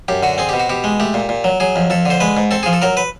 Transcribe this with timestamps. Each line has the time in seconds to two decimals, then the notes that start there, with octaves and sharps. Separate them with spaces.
0.08 F#2 G4
0.23 D3 F#4
0.38 C4 G#4
0.49 B2 G4
0.60 F#4
0.69 B2 G4
0.84 G#3
1.00 A3 G4
1.14 A#2
1.29 A#2
1.44 F#3
1.60 F#3 G#4
1.76 F2
1.90 F2 A4
2.06 D3 C5
2.20 G#3 B4
2.37 G#2
2.51 C4 A4
2.63 F3 G#4
2.73 A4
2.82 F#3 A#4
2.97 B4